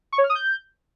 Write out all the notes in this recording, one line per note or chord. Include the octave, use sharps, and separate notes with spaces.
C#6
C#5
F6
D#6
G6